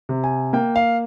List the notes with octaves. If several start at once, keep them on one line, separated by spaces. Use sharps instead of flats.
C3
G#5
A#3 G5
F5